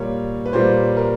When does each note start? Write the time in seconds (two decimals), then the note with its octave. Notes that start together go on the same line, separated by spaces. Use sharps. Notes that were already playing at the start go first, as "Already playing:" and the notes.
Already playing: A#2 G3 A#3 C#5
0.46 B4
0.53 A#2 G3 A#3 C5
0.97 A#4